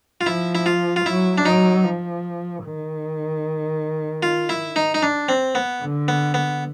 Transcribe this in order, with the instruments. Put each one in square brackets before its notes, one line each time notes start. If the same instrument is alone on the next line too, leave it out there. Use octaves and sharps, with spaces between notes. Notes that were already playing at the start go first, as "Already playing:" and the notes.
[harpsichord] F4
[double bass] F3 [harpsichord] E4
[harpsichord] E4
F4
F4
[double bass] F#3 [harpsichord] E4
[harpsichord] D4
[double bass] F#3 [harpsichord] D#4
[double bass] F3
D#3
[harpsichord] F4
E4
D#4
D#4
D4
C4
B3
[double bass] D3
[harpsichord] B3
B3